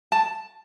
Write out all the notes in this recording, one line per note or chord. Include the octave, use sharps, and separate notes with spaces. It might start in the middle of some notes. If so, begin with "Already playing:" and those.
A5